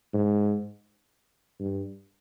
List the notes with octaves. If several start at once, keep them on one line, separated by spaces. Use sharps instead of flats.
G#2
G2